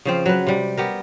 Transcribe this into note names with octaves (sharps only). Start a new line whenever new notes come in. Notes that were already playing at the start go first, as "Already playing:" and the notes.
C#3 F3 C4
F#3 B4
C3 G3
B3 G4 A#4